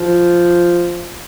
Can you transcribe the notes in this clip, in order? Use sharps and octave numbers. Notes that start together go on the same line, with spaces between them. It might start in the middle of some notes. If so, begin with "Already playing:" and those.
Already playing: F3